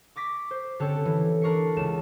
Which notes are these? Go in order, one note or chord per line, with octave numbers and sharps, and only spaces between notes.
C#6 D6 A#6 B6
C5
D3 C4 C#4 G4 A4 C#5
E3
D4 A#4 C#6 C7 C#7
C#2 E7